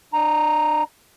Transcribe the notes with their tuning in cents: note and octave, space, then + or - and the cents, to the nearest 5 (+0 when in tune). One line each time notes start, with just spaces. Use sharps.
D4 +35 A#5 +0